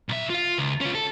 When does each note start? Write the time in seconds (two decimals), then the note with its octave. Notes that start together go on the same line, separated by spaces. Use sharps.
0.09 B1 E5
0.30 F4 F5
0.58 C#2
0.81 C#4 F4
0.95 A4